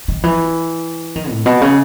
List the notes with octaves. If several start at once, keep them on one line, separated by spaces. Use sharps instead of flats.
D#3
E3
D#3
A2
B2
C#3